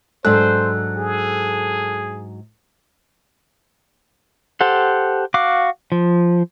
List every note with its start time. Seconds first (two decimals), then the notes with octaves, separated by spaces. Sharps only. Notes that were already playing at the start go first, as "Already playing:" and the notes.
0.25 G#2 F#3 D4 A4 C5 F#6
0.97 G#4
4.61 G4 A4 C5 F#5
5.34 F#4 F5 D6
5.92 F3